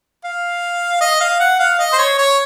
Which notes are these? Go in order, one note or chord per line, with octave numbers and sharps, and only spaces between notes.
F5
D#5
F5
F#5
F5
D#5
C5
C#5
C#5